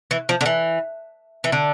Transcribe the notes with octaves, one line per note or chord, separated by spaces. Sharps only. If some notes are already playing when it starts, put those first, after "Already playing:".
E3
F3
D3
E3
E3
D3